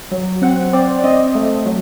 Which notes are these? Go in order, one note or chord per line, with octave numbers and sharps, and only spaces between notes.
F#3
C4 F#5
C4 D5
D5
C4 D#5
A3
F#3